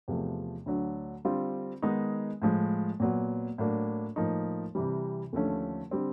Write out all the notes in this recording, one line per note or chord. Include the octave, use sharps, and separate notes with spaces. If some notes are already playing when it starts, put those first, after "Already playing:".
E2 C3 F3 A3
D2 D3 F#3
D3 G3 C4 F4
D#3 G#3 B3 D#4
A2 F3 G#3
A#2 F#3 B3
A2 F#3 A#3 D4
A2 F3 A#3 D#4
C3 E3 G3
D#2 D3 F3 A3 C#4
D3 G3 C4